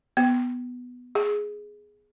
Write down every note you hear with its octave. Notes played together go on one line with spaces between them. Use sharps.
B3
G#4